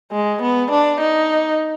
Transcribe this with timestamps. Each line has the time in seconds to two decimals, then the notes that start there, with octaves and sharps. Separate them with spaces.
0.12 G#3
0.42 B3
0.71 D4
1.00 D#4